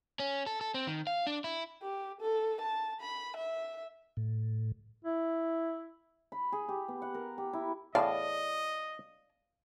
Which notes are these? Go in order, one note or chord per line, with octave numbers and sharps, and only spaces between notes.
C#4
A4
A4
C4
D#3
F5
D4
E4
G4
A4
A5
B5
E5
A2
E4
B5
G#4
G4
B3
F#5
A#4
G4
E4
E2 A2 D5 D#5 F5 A5